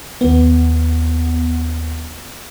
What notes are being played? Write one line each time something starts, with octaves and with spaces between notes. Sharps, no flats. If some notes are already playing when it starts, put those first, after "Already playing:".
D#2 B3